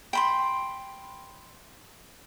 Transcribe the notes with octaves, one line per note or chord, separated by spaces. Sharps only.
G5 B5 C6